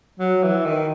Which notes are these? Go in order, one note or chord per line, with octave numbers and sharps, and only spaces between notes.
F#3
E3
D#3